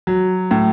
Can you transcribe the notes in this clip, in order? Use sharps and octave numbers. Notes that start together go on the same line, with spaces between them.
F#3
A2